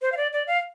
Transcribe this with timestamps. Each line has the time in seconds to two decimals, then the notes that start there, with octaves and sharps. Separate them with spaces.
0.02 C5
0.12 F5
0.17 D5
0.33 D5
0.47 F5